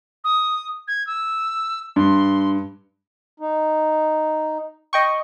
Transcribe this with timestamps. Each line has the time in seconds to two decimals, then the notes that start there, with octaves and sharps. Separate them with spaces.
0.24 D#6
0.88 G#6
1.07 E6
1.96 G2 C6
3.40 D#4
4.93 D#5 G5 C#6